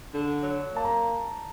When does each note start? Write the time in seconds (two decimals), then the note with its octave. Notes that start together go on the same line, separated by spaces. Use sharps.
0.12 D3
0.43 F#3
0.73 A#3 A5
0.84 A#5